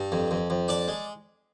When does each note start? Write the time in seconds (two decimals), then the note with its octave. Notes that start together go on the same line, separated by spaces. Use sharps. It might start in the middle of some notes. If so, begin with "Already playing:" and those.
Already playing: G2
0.12 F2
0.31 F2
0.50 F2
0.68 D4 D5
0.88 G#3